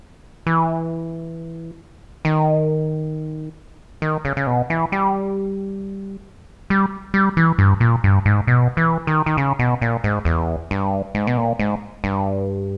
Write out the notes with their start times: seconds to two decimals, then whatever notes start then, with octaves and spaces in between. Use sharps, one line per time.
0.47 E3
2.25 D#3
4.02 D#3
4.25 C#3
4.37 C#3
4.47 B2
4.70 E3
4.92 G3
6.70 G3
7.14 G3
7.37 E3
7.59 G2
7.80 A#2
8.04 G2
8.25 G#2
8.47 B2
8.77 E3
9.07 D#3
9.26 D#3
9.37 C#3
9.59 B2
9.82 A#2
10.04 G#2
10.25 E2
10.71 G2
11.15 G#2
11.27 B2
11.37 A#2
11.59 G#2
12.04 G2